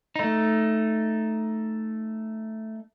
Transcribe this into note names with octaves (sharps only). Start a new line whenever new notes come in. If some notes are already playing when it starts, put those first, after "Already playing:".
A3 D#4